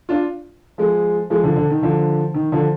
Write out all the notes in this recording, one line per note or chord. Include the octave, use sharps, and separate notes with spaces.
D4 F4
F3 G#3
F3 G#3
D3 F3
D3
D#3
D3 F3
D#3
D3 F3